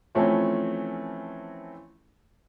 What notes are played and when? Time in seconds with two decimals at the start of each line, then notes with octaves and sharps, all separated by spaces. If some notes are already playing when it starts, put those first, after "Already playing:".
0.15 E3 F3 A3 C4 C#4 F4